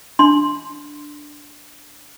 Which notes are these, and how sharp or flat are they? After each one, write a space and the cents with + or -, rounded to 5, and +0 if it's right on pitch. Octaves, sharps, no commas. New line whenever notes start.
D4 +0 C6 +0